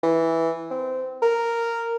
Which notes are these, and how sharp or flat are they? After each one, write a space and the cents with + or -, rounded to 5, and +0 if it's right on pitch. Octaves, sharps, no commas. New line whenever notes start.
E3 -5
C4 -20
A#4 -5